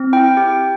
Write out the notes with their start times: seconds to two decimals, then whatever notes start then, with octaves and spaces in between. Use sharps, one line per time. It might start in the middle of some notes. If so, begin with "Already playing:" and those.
Already playing: C4
0.13 E4 G5
0.37 G4 G5